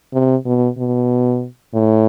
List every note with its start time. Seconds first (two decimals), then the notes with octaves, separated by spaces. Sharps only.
0.13 C3
0.46 B2
0.78 B2
1.74 A2